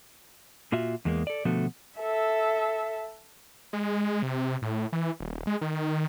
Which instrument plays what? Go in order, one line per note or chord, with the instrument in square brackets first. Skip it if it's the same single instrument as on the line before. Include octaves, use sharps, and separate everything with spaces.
[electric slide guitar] A#2 F4 F#4 E5
E2 G#3 A#3
A4 D5
B2 D3 F3 A3 B3 F#4
[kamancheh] A4 E5
[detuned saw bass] G#3
C3
A2
E3
D#1
G#3
D#3